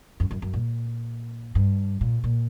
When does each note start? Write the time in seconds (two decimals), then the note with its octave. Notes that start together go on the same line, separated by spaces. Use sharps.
0.20 F#2
0.31 F#2
0.42 F#2
0.53 A#2
1.55 G2
2.01 A#2
2.24 A#2